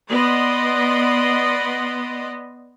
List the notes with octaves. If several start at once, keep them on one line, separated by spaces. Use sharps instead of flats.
B3 D5 D#5 C6